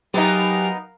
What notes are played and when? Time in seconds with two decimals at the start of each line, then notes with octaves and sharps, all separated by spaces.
0.14 F#3 B3 D#4 G4 A#4 F5 G#5